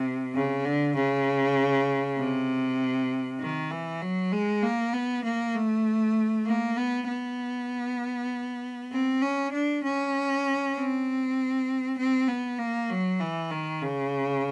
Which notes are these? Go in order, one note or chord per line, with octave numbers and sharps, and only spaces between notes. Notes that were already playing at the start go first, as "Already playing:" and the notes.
Already playing: C3
C#3
D3
C#3
C3
D#3
E3
F#3
G#3
A#3
B3
A#3
A3
A#3
B3
B3
C4
C#4
D4
C#4
C4
C4
B3
A#3
F#3
E3
D#3
C#3